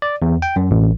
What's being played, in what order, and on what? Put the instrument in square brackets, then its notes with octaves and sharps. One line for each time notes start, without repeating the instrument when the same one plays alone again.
[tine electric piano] D5
E2
G5
F#2
A1